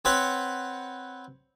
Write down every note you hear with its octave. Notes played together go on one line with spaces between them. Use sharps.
C4 B4 C#5 F#5 B5